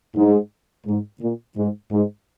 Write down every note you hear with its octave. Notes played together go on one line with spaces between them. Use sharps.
G#2
G#2
A#2
G#2
G#2